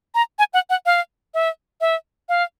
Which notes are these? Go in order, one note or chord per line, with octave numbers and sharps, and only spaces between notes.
A#5
G#5
F#5
F#5
F5
E5
E5
F5